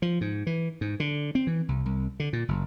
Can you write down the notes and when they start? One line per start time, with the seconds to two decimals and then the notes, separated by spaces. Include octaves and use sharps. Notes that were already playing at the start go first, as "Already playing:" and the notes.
0.02 F3
0.21 G#2
0.47 E3
0.81 G#2
1.00 D3
1.35 C4
1.47 E3
1.69 C2
1.86 C2
2.20 D3
2.33 A#2
2.48 F#1